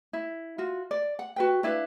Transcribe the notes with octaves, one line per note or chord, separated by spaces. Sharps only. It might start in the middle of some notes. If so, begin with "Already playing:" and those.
E4
F4 F#4
D5
F#5
F#4 B4 G5
D4 E4 B4 F5